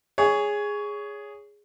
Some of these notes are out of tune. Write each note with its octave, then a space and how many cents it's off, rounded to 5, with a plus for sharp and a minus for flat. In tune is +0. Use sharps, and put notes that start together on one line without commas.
G#4 -5 C#5 +15